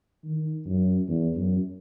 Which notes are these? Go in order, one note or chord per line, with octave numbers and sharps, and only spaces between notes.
D#3
F#2
E2
F#2